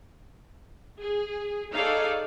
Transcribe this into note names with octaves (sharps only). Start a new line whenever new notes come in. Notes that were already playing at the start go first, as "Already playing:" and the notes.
G#4
D#4 G#4 A4 C#5 D5 F5